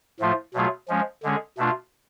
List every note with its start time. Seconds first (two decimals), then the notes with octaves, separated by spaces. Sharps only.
0.20 A2 F3 A3 F4
0.54 B2 F#3 A3 F4 G#4
0.89 F3 G#3 C#4
1.23 D3 G#3 C#4 G#4
1.58 B2 A3 D4 F4